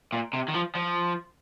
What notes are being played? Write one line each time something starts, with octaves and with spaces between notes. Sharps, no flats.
A#2
C3
D#3
F3
F3